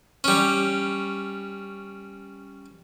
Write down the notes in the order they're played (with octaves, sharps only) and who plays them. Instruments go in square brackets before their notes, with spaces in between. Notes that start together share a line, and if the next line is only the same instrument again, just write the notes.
[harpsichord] G3 C#4